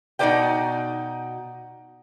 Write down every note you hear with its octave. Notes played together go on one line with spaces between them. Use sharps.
B2 D#4 F#4 C5 D5 G5